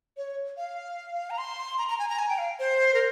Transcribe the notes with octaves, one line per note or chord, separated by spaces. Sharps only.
C#5
F5
A#5
C6
A#5
A#5
G#5
A#5
G#5
G5
F5
C5
A#4